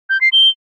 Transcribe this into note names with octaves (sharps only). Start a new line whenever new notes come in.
G6
C7
G7